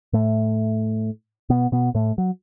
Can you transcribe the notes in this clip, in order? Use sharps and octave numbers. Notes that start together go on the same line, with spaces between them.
A2 A3
B2 B3
B2 B3
A2 A3
F#3